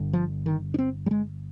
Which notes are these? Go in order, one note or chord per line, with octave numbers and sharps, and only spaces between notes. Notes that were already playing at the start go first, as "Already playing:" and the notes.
Already playing: G1 G2 D3
F3
D#3
D4
C4
G3
G#3